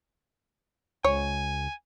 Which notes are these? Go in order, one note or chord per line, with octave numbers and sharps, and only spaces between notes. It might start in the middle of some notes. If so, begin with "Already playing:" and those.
C#2 C#5 G#5